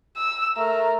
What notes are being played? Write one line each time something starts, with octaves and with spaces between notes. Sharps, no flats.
E6
A3 A#4